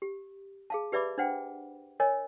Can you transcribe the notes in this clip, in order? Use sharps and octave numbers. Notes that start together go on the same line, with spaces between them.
G4
G#4 F5 A5
G4 B4 D5 E5 B5 D6
D4 C5 F#5 G5
A#4 C#5 D#5 G#5